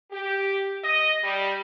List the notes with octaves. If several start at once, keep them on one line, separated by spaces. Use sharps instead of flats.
G4
D#5
G3